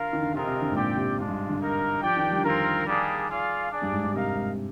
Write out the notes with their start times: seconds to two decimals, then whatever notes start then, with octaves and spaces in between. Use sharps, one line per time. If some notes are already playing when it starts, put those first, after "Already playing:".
Already playing: D3 F4 A#4 F5
0.13 D#3
0.22 D3
0.33 C3 G#3 C4 F4 A#4 D#5
0.47 C3
0.61 D3
0.70 G#2
0.75 A#2 C4 G4 D5 G5
0.97 C3
1.18 G#2 G#3 D4 F4
1.28 G2
1.49 D3
1.59 A#3 D#4 A#4
2.02 F3 D4 G4 D5 G5
2.17 D#3
2.31 G3
2.37 D3
2.44 D#3 C4 F4 A#4
2.87 G3 A#3 D4 G#4
3.29 F4 G#4 D5 F5
3.71 D4 G#4 D5
3.82 G2
3.92 G#2
4.04 G#2
4.14 C3 D#4 A#4 F5
4.35 G#2